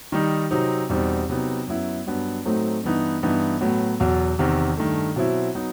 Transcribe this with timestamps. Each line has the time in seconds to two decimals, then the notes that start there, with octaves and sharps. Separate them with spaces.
0.12 D#3 G3 D#4
0.51 C3 F#3 C4 D#4
0.90 E2 B2 G3 C4 D#4
1.29 C3 F#3 B3 D#4
1.67 F#2 F#3 B3 E4
2.07 G2 F#3 B3
2.45 A2 F#3 A3 C4 D#4
2.84 G2 E3 B3 D#4
3.23 G2 E3 B3 D#4
3.61 A2 F#3 B3
4.00 E2 B2 F#3
4.39 E2 C3 D#3
4.77 G2 D#3 A3
5.16 B2 F#3 C4 E4
5.55 F#3 B3 D#4